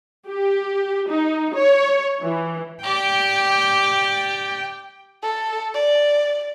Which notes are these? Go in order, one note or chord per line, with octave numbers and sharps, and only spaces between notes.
G4
D#4
C#5
E3
G4 D5 G5
A4
D5